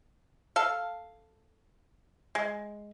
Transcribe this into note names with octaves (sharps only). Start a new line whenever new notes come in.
A4 F5
G#3